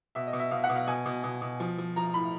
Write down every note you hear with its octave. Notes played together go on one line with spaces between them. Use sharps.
B2 E5
D#5
B2
E5
B2 F5
F#5
B2
F5
B2 G#5
B2
B2
B2
F3
F3
F3 A#5
A2 B5